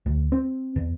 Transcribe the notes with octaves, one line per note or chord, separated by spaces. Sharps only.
D2
C4
E2